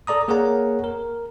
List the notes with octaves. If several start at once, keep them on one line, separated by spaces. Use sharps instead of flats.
A4 D5 A#5 D#6
A#3 G#4 A#4 C#5 F#5 A#5
A#4